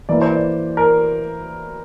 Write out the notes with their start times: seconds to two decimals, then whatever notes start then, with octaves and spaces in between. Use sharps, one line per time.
0.09 E3 A#3 E4 D5
0.21 C5
0.35 D5
0.77 A#4